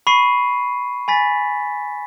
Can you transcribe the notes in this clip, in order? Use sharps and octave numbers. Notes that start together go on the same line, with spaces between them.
B5 C#6 C7 D#7
G#5 B5 A6 B6